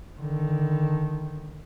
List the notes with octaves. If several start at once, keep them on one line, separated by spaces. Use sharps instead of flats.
D3 D#3